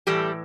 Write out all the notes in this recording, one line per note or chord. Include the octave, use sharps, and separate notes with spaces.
A2 E3 G3 A3 G4